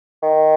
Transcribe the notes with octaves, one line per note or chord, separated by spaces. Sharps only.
D#3